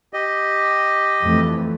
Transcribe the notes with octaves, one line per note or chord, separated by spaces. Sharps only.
G4 D#5
F2 E3 A3